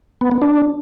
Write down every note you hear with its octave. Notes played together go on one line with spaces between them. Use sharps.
B3
B3
D4